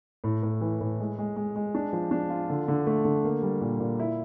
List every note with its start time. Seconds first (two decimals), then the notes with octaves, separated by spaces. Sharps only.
0.24 A2
0.43 A2
0.61 E3
0.81 A2
1.00 G#3
1.18 G#3
1.36 G#3
1.56 G#3
1.75 D4
1.93 F3
2.11 D4
2.30 F4
2.50 D3
2.68 D3
2.87 A3
3.05 D3
3.24 A#3
3.43 G3
3.61 A#2
3.80 A#2
3.99 E4